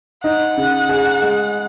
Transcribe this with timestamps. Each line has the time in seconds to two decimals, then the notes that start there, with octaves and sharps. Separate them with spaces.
0.24 D#4 F#5
0.57 C#3
0.89 G#4
1.22 G#3